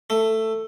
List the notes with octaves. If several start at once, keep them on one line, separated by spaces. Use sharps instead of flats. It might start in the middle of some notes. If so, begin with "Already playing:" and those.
A3